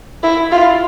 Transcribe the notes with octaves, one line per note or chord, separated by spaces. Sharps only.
E4
F4